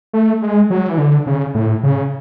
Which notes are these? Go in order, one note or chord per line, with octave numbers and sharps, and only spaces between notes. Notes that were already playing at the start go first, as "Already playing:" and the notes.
A3
G#3
F#3
E3
D3
C#3
A2
C#3